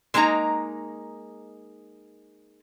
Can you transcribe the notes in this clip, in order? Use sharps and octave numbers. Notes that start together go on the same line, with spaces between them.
G#3 A#3 D4 D#4 A#5